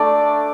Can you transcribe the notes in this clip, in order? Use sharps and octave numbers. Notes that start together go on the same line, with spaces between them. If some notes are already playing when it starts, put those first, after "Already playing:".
Already playing: A3 D4 D5